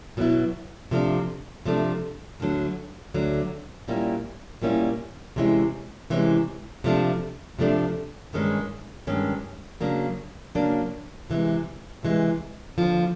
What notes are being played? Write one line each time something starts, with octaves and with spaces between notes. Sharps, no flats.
B2 F#3 B3 E4
C3 F3 A3 D4
C3 F3 A3 D4
D2 D3 F#3
D2 D3 F#3
A#2 G3 A#3 C#4 E4
A#2 G3 A#3 C#4 E4
C3 E3 G#3 C#4 E4
C3 E3 G#3 C#4 E4
C3 F3 A3 D4
C3 F3 A3 D4
G2 D#3 G#3 C#4
G2 D#3 G#3 C#4
C#3 F#3 A#3 D4
C#3 F#3 A#3 D4
C3 E3 G#3
C3 E3 G#3
D#2 D3 F3